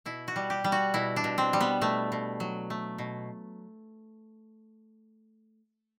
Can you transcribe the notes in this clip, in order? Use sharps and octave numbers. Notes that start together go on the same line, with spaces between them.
B2 E4
F#4
G3
G4
G3
F#4
B2 E4
D4
B2
C4
G3
B3
B2 A3
B2
F#3
A3
B2